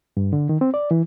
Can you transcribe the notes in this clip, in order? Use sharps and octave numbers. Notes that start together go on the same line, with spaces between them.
G2
D3
D#3
C4
D5
E3